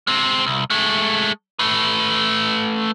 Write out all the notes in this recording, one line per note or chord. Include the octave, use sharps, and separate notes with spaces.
G#3 C4
C2
G#3 A3
A3 B4